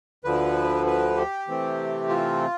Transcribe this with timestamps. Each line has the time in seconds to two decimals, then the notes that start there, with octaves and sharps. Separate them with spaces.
0.24 D2 D3 F3 B4
0.86 B4
1.17 G4
1.47 C3 E3 A3 C4
2.09 F4